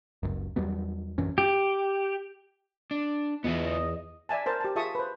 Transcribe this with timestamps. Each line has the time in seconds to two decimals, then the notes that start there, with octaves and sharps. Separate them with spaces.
0.23 F#1 C#2 F#2
0.56 E2 F#3 G3 B3
1.18 A#1 F#2 E3 C#4
1.38 G4
2.91 D4
3.44 E2 B3 F4 D#5 E5
4.29 D5 E5 G#5 A5
4.46 A#4 C5 A5
4.61 G4 A5
4.76 F4 G#4 E5 A5 C#6 D#6
4.95 B4 C5